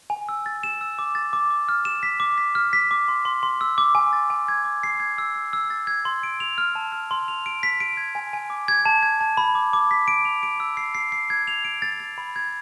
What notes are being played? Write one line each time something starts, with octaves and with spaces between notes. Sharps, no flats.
G#5
E6
A6
E7
E6
D6
A6
D6
D6
F6
E7
B6
D6
B6
F6
B6
D6
C6
C6
C6
E6
D6
G#5
A6
G#5
G#6
D6
C7
G#6
E6
E6
E6
A6
G#6
C6
D7
F7
F6
A5
F6
C6
F7
D7
B6
D7
G#6
G#5
G#5
D6
G#6
A5
G#6
A5
B5
D6
D6
B6
D7
F7
D7
E6
C7
C7
C7
G#6
F7
D7
A6
A6
B5
G#6